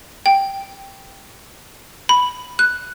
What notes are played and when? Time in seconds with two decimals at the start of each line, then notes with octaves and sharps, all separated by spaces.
0.26 G5
2.09 B5
2.59 F#6